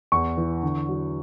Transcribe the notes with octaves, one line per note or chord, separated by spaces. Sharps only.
E2 C#6
E3
D3
F#3